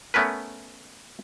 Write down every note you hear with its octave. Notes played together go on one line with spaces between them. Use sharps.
A3 B3 C#4 A#4 B4